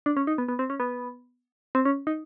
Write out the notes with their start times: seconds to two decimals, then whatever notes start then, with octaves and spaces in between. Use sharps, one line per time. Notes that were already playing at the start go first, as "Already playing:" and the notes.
0.06 D4
0.17 C#4
0.27 D#4
0.38 B3
0.48 B3
0.59 C4
0.70 C#4
0.80 B3
1.75 C4
1.85 C#4
2.07 D#4